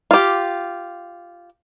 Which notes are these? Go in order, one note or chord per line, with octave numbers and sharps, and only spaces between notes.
F4 G4